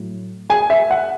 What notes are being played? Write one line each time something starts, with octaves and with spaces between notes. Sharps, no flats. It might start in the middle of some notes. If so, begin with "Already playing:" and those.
Already playing: A2 F#3
G#4 G#5
E5
F#5